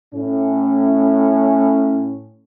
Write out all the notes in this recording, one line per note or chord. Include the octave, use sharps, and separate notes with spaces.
A2 C#4